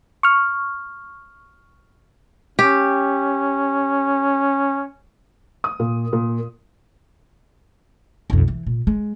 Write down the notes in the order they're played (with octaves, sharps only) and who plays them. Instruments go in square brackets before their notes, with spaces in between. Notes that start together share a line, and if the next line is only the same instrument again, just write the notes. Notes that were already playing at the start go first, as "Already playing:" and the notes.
[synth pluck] C#6 F6
[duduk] C#4 [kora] G4
[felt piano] D#6
A#2
A#2
[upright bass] B1 F2
E3
A#2
G#3